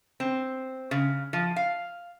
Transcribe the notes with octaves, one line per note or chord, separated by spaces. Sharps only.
C4
C#3
F3
F5